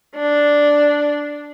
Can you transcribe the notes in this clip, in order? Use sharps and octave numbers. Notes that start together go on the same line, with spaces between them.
D4